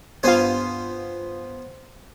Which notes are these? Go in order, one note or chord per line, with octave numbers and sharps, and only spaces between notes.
G2 B3 F4 C5 G#5